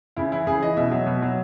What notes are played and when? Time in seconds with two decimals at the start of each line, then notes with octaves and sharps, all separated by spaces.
0.17 C#3 E4
0.32 E3 E4
0.47 C#3 G#4
0.61 E3 D#5
0.77 B2 E5
0.91 F#3
1.07 B2
1.22 F#3